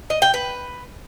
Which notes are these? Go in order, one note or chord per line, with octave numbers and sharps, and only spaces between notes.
D#5
G5
B4